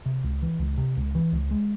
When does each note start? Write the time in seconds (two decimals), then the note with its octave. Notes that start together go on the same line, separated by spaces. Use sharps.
0.06 C3
0.24 C#2
0.42 E3
0.59 C#2
0.77 C3
0.97 C#2
1.15 E3
1.33 C#2
1.51 G#3